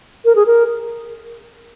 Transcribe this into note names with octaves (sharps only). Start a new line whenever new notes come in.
A#4
G#4
A#4